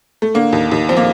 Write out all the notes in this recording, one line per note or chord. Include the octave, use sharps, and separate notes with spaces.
A3
D3 A#3
D#2
D#2
F3 C4
A#3